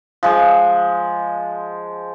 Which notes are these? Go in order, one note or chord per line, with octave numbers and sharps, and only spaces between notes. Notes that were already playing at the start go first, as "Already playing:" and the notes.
F3 G#3